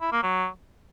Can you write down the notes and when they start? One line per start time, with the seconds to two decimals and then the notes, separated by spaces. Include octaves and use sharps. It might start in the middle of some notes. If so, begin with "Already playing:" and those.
0.02 E4
0.12 A#3
0.23 F#3